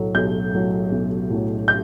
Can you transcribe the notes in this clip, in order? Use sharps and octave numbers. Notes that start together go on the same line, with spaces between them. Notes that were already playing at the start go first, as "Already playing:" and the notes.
Already playing: B1 A2 F#3 A3
B1 G6
A2 F#3 A3
B1
A2 F#3 A3
G6